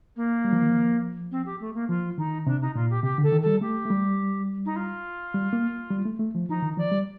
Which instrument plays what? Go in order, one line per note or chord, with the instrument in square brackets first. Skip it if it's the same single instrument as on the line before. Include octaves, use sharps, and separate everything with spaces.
[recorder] A#3
[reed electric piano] G3
F3
D#3
F3
[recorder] C4
G4
A3
A#3
[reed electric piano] F3 [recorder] F4
[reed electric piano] D#3 [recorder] D#4
[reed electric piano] C3 [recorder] D4
[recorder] D#4
[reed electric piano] A#2 [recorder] F4
[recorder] G4
[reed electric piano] C3 [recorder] G4
[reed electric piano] D3 [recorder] A4
[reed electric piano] D#3
[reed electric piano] G3 [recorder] A4
[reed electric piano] A3 [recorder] G4
[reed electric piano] A3
G3
[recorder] D#4
F4
[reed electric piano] G3
A#3
G3
A3
A3
F3
[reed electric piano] F3 [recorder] D#4
[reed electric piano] D#3
[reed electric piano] F3 [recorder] D5
[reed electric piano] G3